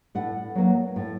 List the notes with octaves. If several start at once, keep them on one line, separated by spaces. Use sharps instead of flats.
A2 F#5
F#3 A#3
A2